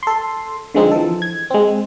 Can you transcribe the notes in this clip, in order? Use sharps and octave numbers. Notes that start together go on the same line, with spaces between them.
A4 C6
D3 F3 G#3 C4 D#4
E3 F3 A4
G#6
G#3 C4